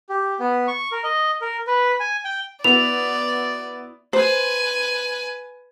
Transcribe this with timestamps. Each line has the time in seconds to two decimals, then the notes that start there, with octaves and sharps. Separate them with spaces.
0.09 G4
0.40 B3
0.68 C#6
0.92 A#4
1.04 D#5
1.41 A#4
1.67 B4
2.00 G#5
2.25 G5
2.64 B3 E4 F#4 D5 F7
4.13 B4 C5 G#5